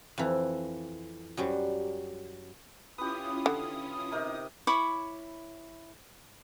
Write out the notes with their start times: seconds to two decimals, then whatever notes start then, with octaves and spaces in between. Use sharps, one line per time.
0.18 F2 E3
1.37 F#2 F#3 G3
2.98 C#4 E4 F4 G4 B4 D#6
3.46 D3
4.12 C3 D#4 A#4
4.67 E4 C#5 B5 D6